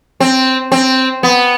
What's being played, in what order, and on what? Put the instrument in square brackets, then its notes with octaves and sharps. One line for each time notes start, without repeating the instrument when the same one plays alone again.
[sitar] C4
C4
B3